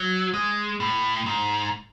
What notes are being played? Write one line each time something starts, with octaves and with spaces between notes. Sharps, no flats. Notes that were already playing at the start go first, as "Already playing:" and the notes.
Already playing: F#3
G#3
A2
G#2